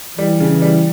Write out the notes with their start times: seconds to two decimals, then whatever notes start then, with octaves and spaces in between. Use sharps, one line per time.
0.18 E3 G3
0.40 C#3
0.62 G3